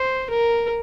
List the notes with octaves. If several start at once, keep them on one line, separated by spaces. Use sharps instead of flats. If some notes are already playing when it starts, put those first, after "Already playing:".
Already playing: C5
A#4